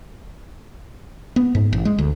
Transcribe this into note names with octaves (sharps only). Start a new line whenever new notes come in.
B3
G#2
A1
G#3
D2